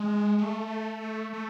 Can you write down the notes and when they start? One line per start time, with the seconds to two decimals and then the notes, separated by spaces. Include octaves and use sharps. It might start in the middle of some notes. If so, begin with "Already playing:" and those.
Already playing: G#3
0.38 G#3
0.42 A3
1.33 A3